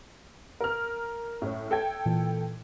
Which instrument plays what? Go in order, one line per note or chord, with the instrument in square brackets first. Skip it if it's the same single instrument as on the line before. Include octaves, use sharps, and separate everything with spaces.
[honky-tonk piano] A#4 F6
A2 C#4
A4 G5 G#6
[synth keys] A#2 E3